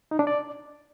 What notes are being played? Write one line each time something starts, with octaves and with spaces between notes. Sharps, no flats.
D#4
D4
D5